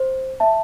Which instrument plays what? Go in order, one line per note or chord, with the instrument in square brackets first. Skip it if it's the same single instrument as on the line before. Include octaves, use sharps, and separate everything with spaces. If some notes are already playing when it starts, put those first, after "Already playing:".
Already playing: [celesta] C5
E5 A5